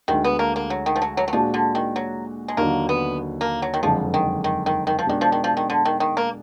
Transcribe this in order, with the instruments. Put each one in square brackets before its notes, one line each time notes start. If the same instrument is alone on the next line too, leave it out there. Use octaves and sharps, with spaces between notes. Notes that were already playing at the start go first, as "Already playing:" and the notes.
[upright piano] D2 D3 G#3 [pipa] D#3
[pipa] B3
A#3
A#3
F#3
D#3
F3
F#3
F#3
F#3
[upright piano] A#2 G#3 D4 F#4 [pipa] F3
[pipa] D3
D#3
F#3
G#3
[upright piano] D#2 D3 F#3 D4 [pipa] A#3
[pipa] B3
A#3
F#3
D#3
[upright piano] F#1 F2 D3 G#3 [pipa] F3
[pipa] D#3
D#3
D#3
D#3
F3
[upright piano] B2 G#3 D4 G#4 [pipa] D#3
[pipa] F3
D#3
F3
D#3
D3
D#3
D#3
A#3